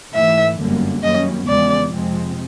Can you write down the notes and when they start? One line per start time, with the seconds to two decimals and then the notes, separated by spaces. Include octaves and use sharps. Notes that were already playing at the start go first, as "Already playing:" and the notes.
0.14 G#2 E3 A3 E5
0.58 G1 F#2 D3 G3 A#3
1.03 F#2 D#3 G3 A#3 C#4 D#5
1.47 E2 C#3 F3 G#3 B3 D5
1.92 F2 C3 F3 G#3 C4